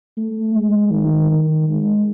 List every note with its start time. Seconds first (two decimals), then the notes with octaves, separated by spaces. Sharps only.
0.17 A3
0.55 G#3
0.92 D#3
1.30 D#3
1.69 G#3